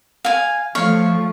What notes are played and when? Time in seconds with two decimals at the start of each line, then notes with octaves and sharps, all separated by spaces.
0.25 F5 G#5
0.75 F3 A3 C#5 F5